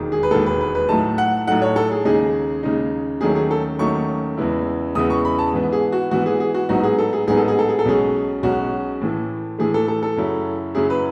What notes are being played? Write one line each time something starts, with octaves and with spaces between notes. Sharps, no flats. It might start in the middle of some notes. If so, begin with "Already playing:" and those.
Already playing: E1 D#2 D#3 G#3
G#4
B4
E1 D#2 D#3 G#3 A4
B4
B4
B4
A2 F#3 A3 D#4 A5
F#5
A2 F#3 A3 D#4 F#5
C#5
A4
G#4
D#2 C#3 G#3 D#4 G#4
D#2 C#3 G#3 D#4
D#2 D#3 F#3 A3 C#4 G#4
G#4
A4
D#2 D#3 F#3 A3 C#4 C#6
E2 C#3 G#3 B3 E4
E2 C#3 G#3 B3 E4 D#6
C#6
B5
A5
G#2 E3 B3
G#4
F#4
G#2 E3 B3 F#4
G#4
G#4
F#4
A1 G#2 F#3 B3 D#4 F#4
G#4
A4
G#4
A1 G#2 F#3 B3 D#4 G#4
A4
G#4
A4
G#4
A4
B1 B2 G#3 C#4 G#4
B1 B2 G#3 C#4 F#4
A2 E3 A3
A2 E3 A3 G#4
A4
A4
A4
F#2 C#3 F#3 C#4 E4
F#2 C#3 F#3 C#4 E4 G#4
B4